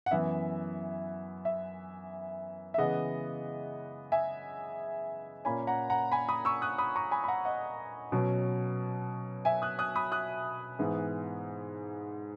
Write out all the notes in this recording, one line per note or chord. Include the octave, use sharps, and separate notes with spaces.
F#5
F#2 E3 B3 E5
E5
E5
C#3 E3 G#3 B3 D#5 F#5
E5 G#5
A#2 A#3 C#4 G#5 B5
F#5 A#5
F#5 A#5
G#5 B5
B5 D#6
C#6 E6
D#6 F#6
B5 D#6
A#5 C#6
G#5 B5
B5
F#5 A#5
D#5 F#5
B2 F#3 C#4
E5 G#5
D#6 F#6
D#6 F#6
B5 D#6
D#6 F#6
G#2 E3 B3